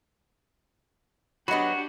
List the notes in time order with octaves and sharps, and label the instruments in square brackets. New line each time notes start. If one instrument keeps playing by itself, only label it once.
[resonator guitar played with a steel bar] F#3 B3 [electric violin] D4 G4 [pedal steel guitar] F#4 [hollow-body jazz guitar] D#5 B5